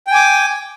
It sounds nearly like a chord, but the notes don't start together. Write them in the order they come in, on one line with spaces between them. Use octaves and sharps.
G5 G#5 D6